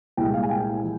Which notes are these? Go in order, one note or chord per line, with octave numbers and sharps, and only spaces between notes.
C2 A#2 G#3 G5
F5
G#5
G5
F3